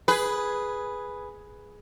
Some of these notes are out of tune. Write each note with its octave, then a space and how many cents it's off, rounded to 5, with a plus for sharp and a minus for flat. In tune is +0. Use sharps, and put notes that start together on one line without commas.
G#4 +0 B4 +0